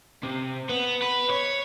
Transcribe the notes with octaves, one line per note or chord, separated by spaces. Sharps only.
C3
B3
B4
C#5